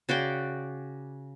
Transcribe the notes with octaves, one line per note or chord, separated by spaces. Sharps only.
C#3 F#4 D5 G5